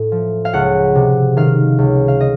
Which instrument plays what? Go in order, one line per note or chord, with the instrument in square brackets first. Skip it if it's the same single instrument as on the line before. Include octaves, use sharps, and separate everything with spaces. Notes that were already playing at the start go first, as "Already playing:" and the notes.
Already playing: [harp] A2
F3
F5
C#2 F#5
C3
D#3 F5
C#2
F5
D#5